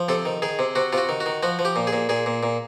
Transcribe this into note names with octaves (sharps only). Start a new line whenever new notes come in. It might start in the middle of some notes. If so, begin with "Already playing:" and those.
Already playing: F3
C3 A4
D#3
D#3 G#4
C3
C3 F#4
C3 F4
F#4
D#3
F#4
D#3
F3 F#4
F3
G4
A#2
G#4
A#2
A#2 G#4
A#2
A#2